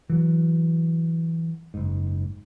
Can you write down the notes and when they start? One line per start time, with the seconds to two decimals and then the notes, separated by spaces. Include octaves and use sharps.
0.10 E3 F#3
1.74 F#1 G#2